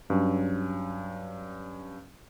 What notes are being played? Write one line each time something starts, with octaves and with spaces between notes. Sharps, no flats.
G2 F#3 C#4